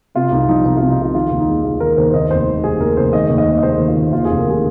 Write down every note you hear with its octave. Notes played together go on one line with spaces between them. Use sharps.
C3 F4
C2 D#4
F3 D#4
C2 D#4
C3 F4
D#4
C2 F4
D#3 F4
D#2
D#4
G#3
D#2 F4
D#3 A#4
D#2 C5
C5
D#2 D#5
F1 C5
D#3
G#3 G#4
D#2 A#4
F1 C5
D#3 D#5
D#2
D#5
G#3
D#5
D#2 C5
D#3
F4
D#2
D#2 F4
F1 G#4
A#4
D#3 G#4